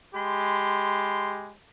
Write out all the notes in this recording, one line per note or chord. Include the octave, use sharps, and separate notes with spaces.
G#3 G4 B5 C6